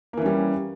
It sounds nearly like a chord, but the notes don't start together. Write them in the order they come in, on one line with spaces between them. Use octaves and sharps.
A#3 E3 C#4 G3